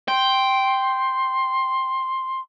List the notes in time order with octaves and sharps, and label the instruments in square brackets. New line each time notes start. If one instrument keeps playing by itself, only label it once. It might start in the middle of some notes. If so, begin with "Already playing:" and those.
[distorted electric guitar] G5 [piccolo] C6